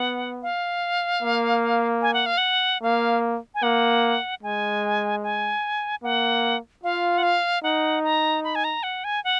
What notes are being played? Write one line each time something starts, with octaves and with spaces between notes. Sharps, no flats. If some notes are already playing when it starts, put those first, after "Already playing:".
Already playing: B3 F#5
F5
A#3
G#5
F#5
F5
F#5
A#3 F5
G#5
A#3 F#5
G#3 G#5
G#5
A#3 F#5
F4 F5
F#5
F5
D#4 F#5
A#5
B5
G#5
A#5
F#5
G#5
F#5